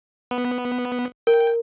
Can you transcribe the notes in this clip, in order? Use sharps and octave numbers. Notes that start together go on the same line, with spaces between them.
B3
A#4 G5